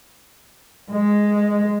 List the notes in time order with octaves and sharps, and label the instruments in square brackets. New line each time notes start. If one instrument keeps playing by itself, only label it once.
[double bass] G#3